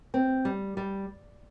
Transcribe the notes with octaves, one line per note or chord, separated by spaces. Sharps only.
C4
G3
G3